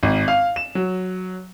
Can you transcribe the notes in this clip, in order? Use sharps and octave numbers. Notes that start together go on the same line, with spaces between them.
G#1
F5
E7
F#3